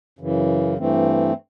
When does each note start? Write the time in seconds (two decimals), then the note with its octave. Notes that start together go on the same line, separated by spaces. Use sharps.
0.19 F#2 C#3 E3
0.77 G2 E3 A3 C4